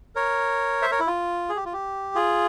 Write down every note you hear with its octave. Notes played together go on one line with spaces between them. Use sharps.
A#4 C#5
C5 E5
A#4 C#5
E4
F4
G#4
G4
F4
G4
F4 G#4